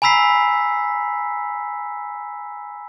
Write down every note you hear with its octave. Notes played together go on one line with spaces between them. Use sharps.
G#5 A#5 B5 E6 B6 C7